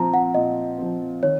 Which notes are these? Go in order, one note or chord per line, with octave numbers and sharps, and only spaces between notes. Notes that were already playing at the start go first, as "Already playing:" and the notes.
Already playing: A#2 F3 C4 A#5
F#5
A#2 D#5
F3 C4
D#3 C#5